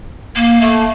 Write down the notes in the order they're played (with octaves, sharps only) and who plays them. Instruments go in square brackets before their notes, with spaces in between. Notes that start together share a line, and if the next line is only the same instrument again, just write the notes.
[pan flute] A#3
[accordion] A3 [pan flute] A#3